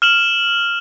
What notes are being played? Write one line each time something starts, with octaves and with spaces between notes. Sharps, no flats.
F6 E7 F#7